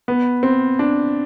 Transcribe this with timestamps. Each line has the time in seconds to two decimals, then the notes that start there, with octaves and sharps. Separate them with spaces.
0.08 B3
0.43 C4
0.79 D4